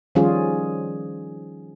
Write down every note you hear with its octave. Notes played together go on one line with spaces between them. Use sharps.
D#3 F3 G3 C#4 F4 G#4